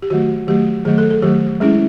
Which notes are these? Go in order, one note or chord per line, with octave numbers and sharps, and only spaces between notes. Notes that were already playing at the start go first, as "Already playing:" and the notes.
G4
D#3 F#3 A3 F#4
D#3 F#3 A3 G4
D#3 F#3 A3 G#4
A4
A4
D#3 F#3 A3 G4
G#3 C#4 E4 G#4